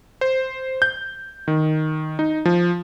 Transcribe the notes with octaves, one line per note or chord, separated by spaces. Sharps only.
C5
G6
D#3
D#4
F3